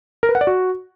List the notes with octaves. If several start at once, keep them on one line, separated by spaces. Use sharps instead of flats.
A#4
B4
F#5
D5
F#4